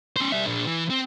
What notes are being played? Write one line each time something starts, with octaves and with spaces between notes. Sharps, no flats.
C#4 C5
G3 E5
A#2 D4
E3
C4